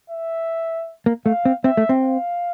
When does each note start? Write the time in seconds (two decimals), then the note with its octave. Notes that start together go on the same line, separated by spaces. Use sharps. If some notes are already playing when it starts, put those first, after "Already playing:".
0.10 E5
1.06 A#3
1.26 A3 F5
1.45 C4
1.64 C4 E5
1.77 A3
1.89 C4
2.03 F5